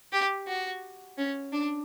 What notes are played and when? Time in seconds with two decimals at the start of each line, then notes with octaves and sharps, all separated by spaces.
0.13 G4
0.47 F#4
1.18 C#4
1.52 D4